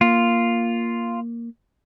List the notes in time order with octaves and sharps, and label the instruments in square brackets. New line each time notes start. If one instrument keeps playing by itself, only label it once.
[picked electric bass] A#3 [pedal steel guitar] F4